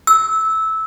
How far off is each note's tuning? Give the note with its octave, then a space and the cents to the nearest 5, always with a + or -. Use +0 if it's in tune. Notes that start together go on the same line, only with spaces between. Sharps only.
E6 -15